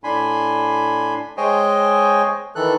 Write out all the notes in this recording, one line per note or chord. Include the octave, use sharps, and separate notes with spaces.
A2 D4 G#5 B5 C6
G#3 C5 C#5 D#5 G5 G#5
D#3 E3 A4 F#6